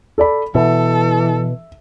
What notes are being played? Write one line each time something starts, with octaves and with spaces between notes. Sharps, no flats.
A4 D5 B5
B2 E3 A4 E5